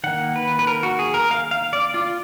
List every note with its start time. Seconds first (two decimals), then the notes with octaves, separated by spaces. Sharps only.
0.04 D#3 A#3 F#5
0.36 B4
0.59 B4
0.67 A#4
0.83 F#4
0.99 G#4
1.14 A#4
1.31 F5
1.51 F5
1.73 D5
1.94 F4